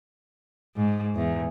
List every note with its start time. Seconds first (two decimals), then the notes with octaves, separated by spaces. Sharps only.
0.76 G#2
1.15 E2